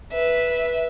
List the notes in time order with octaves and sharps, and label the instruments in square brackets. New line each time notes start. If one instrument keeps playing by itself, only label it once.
[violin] B4 E5